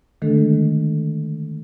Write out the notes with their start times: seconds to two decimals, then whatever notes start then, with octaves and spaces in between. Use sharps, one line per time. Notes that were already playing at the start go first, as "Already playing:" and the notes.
0.22 D3 D#3 G#3 A3 D4 A4